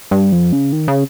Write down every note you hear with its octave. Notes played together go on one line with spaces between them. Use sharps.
G2
F2
C#3
D#3
C#3